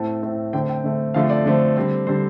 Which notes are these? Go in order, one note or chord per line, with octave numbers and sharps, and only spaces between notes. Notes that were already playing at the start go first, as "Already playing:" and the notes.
Already playing: A2 A3 C4 A5
A2 A3 C4
D3 A3 C4 G5
G5
D3 A3 C4
D3 F3 A3 C4 F5
D5
D3 F3 A3 C4
D3 G3 C4
D3 G3 C4 C5